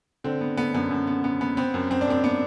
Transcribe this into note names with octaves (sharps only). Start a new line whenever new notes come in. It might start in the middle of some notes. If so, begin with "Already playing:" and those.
D3 C4
B3
D3 B3
F#2 B3
F#2
B3
B3
B3
B3 C4
F#2
F#2 C4
D4
F#2 C4
B3 D4